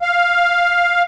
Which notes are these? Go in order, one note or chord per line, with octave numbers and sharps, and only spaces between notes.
F5